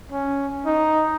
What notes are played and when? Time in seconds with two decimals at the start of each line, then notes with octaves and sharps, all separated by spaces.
0.12 C#4
0.66 D#4